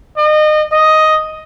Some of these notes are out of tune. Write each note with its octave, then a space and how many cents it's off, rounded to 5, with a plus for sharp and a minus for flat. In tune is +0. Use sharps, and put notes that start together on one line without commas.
D#5 -30
D#5 +5